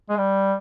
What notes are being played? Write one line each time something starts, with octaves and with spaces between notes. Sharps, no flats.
G#3
G3